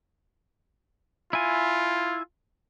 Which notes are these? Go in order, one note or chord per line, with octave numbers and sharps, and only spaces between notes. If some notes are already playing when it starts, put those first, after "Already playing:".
E4 F4 G#5